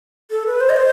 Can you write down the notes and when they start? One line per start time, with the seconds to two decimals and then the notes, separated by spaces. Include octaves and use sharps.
0.31 A4
0.46 B4
0.61 C5
0.69 D#5
0.77 C5